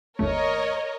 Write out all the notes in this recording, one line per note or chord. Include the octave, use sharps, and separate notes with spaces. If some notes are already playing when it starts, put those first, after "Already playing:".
G1 D#2 A3 A#4 C#5 D#5